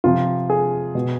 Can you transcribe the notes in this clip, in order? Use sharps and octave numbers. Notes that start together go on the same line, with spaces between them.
C3 F3 F4
G#4
B2